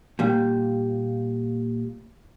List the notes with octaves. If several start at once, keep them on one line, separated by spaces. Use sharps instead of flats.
A#2 G3